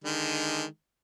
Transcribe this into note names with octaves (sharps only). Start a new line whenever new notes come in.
D3 D#3 G#3